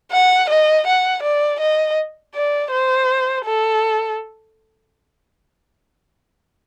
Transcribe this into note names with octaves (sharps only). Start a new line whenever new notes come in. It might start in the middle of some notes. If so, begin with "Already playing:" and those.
F#5
D#5
F#5
D5
D#5
D5
C5
A4